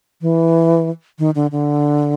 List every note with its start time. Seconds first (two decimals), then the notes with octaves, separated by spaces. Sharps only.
0.21 E3
1.19 D#3
1.35 D3
1.52 D3